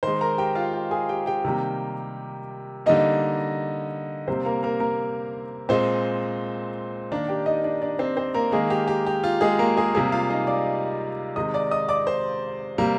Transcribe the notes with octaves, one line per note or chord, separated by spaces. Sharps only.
D#3 G#3 C5 C6
A#4 A#5
G4 G5
F4 F5
G4 G5
G#4 G#5
G4 G5
G4 G5
C3 D#3 G3 A#3
D3 G3 A#3 D#4 D#5
C3 G3 A#3 C4 C5
A#3 A#4
A#3 A#4
A#3 A#4
A#2 G#3 C4 C5
D#3 A#3 D4 D5
G4 G5
D#4 D#5
D4 D5
D4 D5
C4 C5
C4 C5
A#3 A#4
D#3 G#3 A#3 G#4
G4
G4
G4
F4
G#3 G#4
A#3 A#4
G#4 G#5
C3 G3 A#3 G#4 G#5
F4 F5
D#4 D#5
D5 D6
C3 D#3 G#3 D#5 D#6
D5 D6
D#5 D#6
D5 D6
C5 C6
C3 G3 A#3